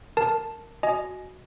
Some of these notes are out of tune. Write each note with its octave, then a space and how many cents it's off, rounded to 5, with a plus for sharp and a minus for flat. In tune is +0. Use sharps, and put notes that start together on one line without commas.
A#4 -10 A5 +0
F#4 +0 D#5 -10 G#5 +15